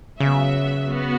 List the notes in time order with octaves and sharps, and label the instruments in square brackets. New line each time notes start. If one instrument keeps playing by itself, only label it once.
[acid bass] C#3 [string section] F#3 B3 F#4 E5
[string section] B3 F#4